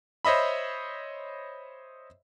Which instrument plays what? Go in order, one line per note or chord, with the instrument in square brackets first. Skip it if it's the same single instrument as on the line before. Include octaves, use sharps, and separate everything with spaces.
[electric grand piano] C5 C#5 D#5 E5 B5